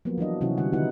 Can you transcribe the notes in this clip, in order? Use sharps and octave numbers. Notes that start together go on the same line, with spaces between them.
F3 F#3 A#3 B3
E3 F#3 D4 D#5
C3 E3 F#3 C#4 E4 F#4
D3 G3 F#5
D3 D#3 B3 D#4 E4 F#5